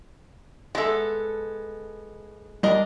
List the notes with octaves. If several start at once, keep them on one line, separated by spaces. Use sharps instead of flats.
G#3 B3 A4 E5
G3 D4 A#4 D#5